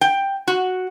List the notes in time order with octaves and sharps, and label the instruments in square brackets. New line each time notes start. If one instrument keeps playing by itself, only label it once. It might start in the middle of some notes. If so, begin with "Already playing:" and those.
[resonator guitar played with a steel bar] G5
F#4